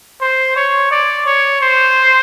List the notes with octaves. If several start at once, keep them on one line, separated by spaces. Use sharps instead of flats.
C5
C#5
D5
C#5
C5